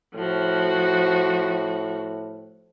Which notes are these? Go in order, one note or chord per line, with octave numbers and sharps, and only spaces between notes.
A2 F3 F#4